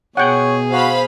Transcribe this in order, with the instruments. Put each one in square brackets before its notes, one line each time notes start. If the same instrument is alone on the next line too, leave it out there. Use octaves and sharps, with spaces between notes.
[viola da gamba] B2 G#4 [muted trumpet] C#5 [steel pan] F#5 G5
[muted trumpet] F#4 [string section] C5 F5 B5